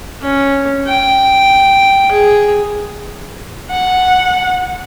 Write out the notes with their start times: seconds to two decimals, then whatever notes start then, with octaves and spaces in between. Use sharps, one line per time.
0.22 C#4
0.87 G5
2.12 G#4
3.71 F#5